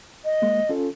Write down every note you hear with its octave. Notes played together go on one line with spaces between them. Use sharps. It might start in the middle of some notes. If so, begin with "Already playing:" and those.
D#5
G#3 A#3
C#4 F4 A4